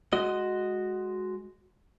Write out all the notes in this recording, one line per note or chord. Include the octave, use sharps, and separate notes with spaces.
G#3 F#4 D#5